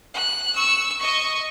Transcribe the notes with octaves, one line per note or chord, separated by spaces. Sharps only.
F#6
C#6 E6
D#5 C#6